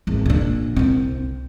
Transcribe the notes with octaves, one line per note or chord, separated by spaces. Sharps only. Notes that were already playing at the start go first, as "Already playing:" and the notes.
G#1 E2
A#2 D4
C2 C4